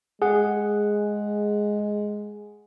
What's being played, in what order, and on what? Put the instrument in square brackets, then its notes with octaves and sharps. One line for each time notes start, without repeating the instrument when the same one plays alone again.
[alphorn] G#3 [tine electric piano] G#4 F#5